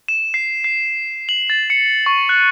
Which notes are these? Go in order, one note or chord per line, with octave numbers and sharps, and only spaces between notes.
E7
C7
C7
F#7
A6
C#7
C#6
F#6